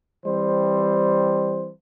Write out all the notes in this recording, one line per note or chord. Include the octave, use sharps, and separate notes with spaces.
E3 G3 C4 C5